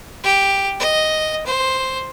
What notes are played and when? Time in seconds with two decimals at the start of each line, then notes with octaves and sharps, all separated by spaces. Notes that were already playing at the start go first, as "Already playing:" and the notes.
0.24 G4
0.79 D#5
1.46 C5